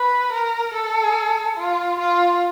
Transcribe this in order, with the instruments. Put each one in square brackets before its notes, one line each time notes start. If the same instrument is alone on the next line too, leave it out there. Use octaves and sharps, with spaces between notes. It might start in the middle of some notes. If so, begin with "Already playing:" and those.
Already playing: [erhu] B4
A#4
A4
F4
F4